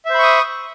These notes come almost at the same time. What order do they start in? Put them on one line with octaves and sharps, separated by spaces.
E5 C5 B5 C#6 D#6